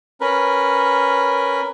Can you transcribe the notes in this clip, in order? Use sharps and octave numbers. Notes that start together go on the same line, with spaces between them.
C#4 A#4 B4